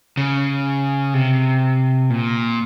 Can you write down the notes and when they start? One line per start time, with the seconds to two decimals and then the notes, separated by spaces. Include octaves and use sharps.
0.17 C#3
1.14 C3
2.10 A#2